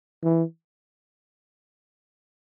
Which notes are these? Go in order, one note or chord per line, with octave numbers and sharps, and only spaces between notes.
E3